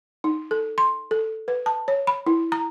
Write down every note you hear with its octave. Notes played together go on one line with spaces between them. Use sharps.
D#4
A4
C6
A4
B4
A5
C#5
B5
E4
A#5